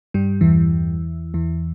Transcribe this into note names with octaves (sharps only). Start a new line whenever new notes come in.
G2 G3
E2 E3
E2 E3